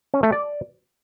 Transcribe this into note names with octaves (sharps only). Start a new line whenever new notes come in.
C#4
A3
D5